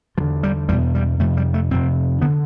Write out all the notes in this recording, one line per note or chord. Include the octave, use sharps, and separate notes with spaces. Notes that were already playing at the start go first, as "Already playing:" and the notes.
E2 D3 F3
G3
E2 B2 G3
G3
F2 C3 A3
G3
A3
F2 C3 C4
D3 B3